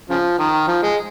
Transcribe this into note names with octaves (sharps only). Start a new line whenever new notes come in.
C#3 F3
D#3
F3
G#3